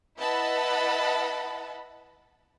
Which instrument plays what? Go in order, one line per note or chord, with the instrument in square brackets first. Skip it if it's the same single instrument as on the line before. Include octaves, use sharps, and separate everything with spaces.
[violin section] E4 B4 D#5 F#5 A5 B5